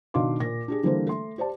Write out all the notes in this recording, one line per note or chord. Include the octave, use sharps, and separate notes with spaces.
B2 D#3 D4 F5 C6 D6
A#2 A#6
D4 G4 G#4
D3 E3 G3 A#3 A4 C5
A3 C6
G4 C5 D5 A5